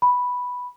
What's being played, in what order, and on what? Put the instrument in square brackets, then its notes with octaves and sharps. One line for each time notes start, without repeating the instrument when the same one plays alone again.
[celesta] B5